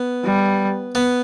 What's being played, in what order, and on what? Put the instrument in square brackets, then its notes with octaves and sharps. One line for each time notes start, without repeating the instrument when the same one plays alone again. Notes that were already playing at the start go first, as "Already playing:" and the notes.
Already playing: [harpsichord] B3
[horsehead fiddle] G3
[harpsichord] B3